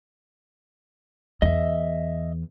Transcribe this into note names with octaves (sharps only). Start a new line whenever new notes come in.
E2 D#5 E5